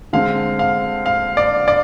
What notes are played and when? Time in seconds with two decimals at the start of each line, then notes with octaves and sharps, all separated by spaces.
0.13 D3 G#3 C4 F5
0.59 F5
1.06 F5
1.37 D5
1.68 D5